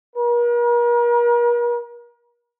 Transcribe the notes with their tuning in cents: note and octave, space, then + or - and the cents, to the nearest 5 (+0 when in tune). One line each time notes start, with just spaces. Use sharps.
A#4 +40